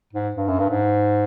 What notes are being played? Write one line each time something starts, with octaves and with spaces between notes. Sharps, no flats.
G#2
G2
F#2
G2
G#2